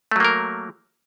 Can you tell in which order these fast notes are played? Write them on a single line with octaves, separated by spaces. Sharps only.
A3 F#3 A#3 A#4